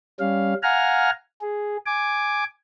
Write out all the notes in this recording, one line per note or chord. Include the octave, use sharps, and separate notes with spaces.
G3 C#4 F5
F5 F#5 G#5 A#5 F6
G#4
G#5 D6